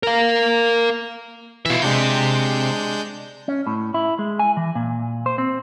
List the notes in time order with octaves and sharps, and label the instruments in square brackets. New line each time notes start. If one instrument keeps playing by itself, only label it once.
[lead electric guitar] A#4 F5
[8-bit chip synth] B2 E3 [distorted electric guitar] F4 E5
[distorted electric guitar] C3 [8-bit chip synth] G#3 D4 G6
[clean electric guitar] C#4
A2
E4
G#3
G#5
E3
A#2
C5
C4